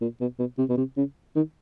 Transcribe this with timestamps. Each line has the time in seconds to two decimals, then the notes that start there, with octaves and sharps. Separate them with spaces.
0.01 A#2
0.20 B2
0.39 B2
0.58 C3
0.69 B2
0.77 C3
0.97 C#3
1.35 D#3